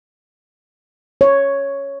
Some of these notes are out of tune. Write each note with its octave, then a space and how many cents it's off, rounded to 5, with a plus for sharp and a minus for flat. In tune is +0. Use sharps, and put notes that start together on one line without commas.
C#5 +0